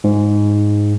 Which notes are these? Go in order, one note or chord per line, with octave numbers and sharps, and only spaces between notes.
G#2